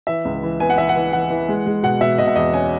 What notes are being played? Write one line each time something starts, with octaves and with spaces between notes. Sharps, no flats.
E3 E5
C#2
E3
B3 G#5
F#5
E3 E5
F#5
E3
E3 F#5
E3
G#3
G#3
B2 F#5
B2 E5
B2 D#5
E5
E2 D#5
C#4 G#5